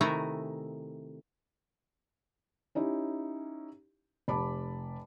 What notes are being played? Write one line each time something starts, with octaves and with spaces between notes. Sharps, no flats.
C3 D#3 A3 E4 G#5 A#5
C#4 D#4 E4 G4
F1 A5 B5 D6